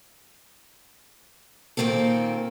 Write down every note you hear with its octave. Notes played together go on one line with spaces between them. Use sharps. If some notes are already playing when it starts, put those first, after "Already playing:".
A#2 D#3 A#3 C4 A4